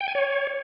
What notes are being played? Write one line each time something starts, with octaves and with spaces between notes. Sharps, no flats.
G5
G#5
C#5